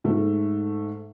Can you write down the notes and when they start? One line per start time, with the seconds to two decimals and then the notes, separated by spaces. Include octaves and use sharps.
0.04 G#2 A3